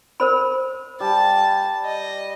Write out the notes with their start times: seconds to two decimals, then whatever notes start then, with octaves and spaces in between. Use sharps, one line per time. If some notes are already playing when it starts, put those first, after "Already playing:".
0.20 A#4 C5 B5
1.00 G3 A5
1.85 D#5